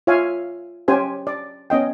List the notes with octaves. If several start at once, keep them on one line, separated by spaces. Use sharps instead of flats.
F4 C#5 E5 F5 G#5
C#4 G4 C5 G#5
D5
B3 C#4 D#5 G5